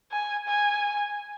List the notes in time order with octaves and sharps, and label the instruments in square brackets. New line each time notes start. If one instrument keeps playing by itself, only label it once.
[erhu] G#5
G#5